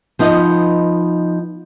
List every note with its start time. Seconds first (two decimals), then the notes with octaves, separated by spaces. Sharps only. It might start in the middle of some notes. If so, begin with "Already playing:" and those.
0.19 F3 B3 D#4 D#5